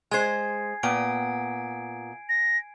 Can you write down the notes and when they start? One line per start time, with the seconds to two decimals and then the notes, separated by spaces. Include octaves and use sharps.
0.11 G#3 C5 G#5 G#6 C7
0.83 A#2 B3 G5 D7
2.29 A#6